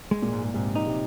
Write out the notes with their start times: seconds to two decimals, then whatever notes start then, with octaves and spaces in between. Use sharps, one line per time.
0.11 G#3
0.22 A#2
0.32 G#2
0.54 G#2 C3
0.75 D#4
0.86 C3